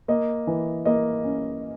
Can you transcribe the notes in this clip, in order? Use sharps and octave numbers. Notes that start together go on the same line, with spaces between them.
A#3 D#5
E3
A#3 D#5
C#4